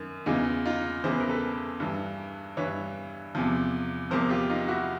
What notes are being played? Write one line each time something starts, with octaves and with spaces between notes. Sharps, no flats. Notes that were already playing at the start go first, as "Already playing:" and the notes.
Already playing: F#2 D#3
E2 C#3 E3 D#4 F4
D#4 F4
E2 C#3 E3 C5
B4
A#4
A4 B4
G2 E3
G2 E3 B4 C#5
E2 C3 F3
E2 C3 F3 A#4 C5
F4 G4
D#4 F4
E4 F#4